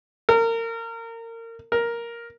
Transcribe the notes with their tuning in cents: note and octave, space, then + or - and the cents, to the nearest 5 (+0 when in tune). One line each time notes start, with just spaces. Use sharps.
A#4 -30
A#4 +5